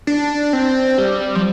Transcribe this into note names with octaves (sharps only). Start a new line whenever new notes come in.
D4
C4
G3
F3